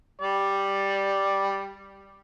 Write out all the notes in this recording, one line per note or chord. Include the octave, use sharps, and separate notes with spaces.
G3 D5